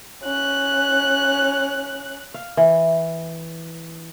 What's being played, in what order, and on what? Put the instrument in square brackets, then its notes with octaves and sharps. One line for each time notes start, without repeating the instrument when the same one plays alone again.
[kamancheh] C#4 F#6
[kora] F5
E3